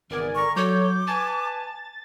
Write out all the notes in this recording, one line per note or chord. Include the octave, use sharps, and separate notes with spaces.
G#1 C#3 E3 B3 A#4 D5 G#5
D3 A#5 C#6
F#3 A4 C#5 C#6 D6 G6
B4 G#5 A5 A6